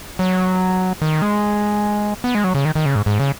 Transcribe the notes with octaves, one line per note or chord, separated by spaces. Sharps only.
F#3
D#3
G#3
B3
G#3
F#3
C#3
D#3
D#3
C#3
G#2
G#2
C#3